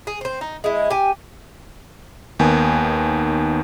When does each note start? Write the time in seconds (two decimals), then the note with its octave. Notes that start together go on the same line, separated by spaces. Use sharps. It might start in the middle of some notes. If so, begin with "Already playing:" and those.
0.07 G#4
0.21 C4 C5
0.41 D#4
0.64 G#3 E4
0.90 G4 G#5
2.39 D#2 D#3 B3 G#5